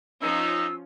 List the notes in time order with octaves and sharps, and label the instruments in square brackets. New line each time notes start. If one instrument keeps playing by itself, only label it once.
[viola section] F3 C#4 F4 [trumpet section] D#4 [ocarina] E6